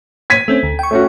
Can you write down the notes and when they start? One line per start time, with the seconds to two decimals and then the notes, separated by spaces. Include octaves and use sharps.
0.30 G#6 B6 D#7
0.48 A3 C4 C#4
0.63 D2
0.79 G5 C#6
0.91 A3 C#4 F#4